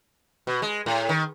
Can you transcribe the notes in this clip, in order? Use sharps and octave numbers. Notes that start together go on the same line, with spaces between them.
B2
G#3
A2
D#3